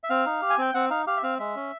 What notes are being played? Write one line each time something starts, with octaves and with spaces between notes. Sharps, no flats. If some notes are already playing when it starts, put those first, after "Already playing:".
E5
C4 F5
D#4
G4
G#5
C4 G5
C4 F#5
D#4 F5
G4 F5
E5
C4 F5
G#3 E5
C#4